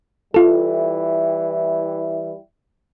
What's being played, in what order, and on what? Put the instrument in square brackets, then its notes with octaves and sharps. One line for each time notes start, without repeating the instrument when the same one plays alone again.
[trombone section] E3 G3 E4 [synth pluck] F4 A4